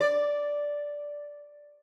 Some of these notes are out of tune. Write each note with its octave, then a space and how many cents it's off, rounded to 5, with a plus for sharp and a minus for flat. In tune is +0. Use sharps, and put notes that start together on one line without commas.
D5 -5